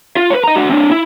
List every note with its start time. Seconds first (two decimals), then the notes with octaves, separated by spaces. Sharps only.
0.17 F4
0.30 B4 C#5
0.44 D#5 A#5
0.56 D4 F#4
0.69 C4 D4
0.91 E4